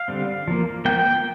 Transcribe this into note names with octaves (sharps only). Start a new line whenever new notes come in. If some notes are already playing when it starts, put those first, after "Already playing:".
Already playing: F5
D3 G3 C4
F3 A#3
F3 A#3 G5